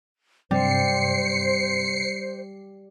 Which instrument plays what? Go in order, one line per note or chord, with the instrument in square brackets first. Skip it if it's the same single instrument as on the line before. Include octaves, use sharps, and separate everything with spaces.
[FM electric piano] G2 C3 [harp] G3 [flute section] C5 [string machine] C7 C#7